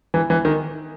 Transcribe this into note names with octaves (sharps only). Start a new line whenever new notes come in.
E3
E3
D#3